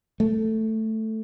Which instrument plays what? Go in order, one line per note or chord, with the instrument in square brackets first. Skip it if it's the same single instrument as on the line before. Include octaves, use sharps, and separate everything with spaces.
[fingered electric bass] A3